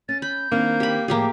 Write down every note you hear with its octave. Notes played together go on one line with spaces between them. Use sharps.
C#4 A6
B5 G6
D#3 A#3 C4 D4
G4 B5
A2 F3 A#3 F4 G4 G#4